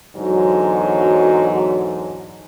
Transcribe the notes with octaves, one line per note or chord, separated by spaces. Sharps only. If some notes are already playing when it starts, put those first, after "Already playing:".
E2 G#2 D3 F#3